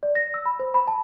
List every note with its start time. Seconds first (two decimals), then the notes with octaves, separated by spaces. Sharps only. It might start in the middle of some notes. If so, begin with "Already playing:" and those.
0.03 D5
0.15 A#6
0.34 E6
0.46 B5
0.59 C5
0.74 B5
0.88 A5